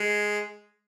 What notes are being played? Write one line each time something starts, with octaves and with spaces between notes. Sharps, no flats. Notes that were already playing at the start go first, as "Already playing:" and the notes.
Already playing: G#3